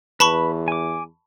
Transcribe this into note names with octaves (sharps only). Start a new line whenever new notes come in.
E2 B4 A5 B5 C#6
G#5 D6